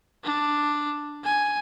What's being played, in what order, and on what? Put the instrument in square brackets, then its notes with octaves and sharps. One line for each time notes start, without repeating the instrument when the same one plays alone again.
[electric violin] D4
G#5